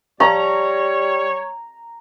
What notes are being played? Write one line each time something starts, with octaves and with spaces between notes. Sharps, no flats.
G3 C#5 F5 A#5 C#6